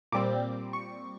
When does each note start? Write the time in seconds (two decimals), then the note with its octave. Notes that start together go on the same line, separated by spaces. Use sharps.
0.12 A#2 G3 C4 D6
0.73 C#6